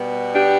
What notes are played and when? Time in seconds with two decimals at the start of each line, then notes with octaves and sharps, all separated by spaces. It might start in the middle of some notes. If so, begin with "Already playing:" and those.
Already playing: B2 G3 B3
0.35 D4 G4